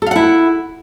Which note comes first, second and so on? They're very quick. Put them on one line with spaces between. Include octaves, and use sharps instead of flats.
A4 F5 F#5 E4